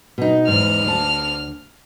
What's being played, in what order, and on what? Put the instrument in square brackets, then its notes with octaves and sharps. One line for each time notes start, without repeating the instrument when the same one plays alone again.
[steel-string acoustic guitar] B2 D#4
[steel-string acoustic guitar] E2 G#2 [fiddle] F6
[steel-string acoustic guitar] D2 A5